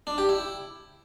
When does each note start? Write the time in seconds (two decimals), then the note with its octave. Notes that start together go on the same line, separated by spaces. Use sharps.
0.07 D4
0.18 G4
0.29 E4